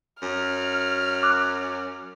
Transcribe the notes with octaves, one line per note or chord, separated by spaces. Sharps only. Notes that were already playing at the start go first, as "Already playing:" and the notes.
F#2 F6
D6 F#6